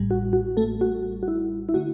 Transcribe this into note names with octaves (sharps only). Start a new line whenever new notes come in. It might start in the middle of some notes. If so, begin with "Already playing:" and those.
Already playing: A1 A2 G3
F#4
F#4
A3 A4
F#4
F#4
E4
E4
D3 A3 F#4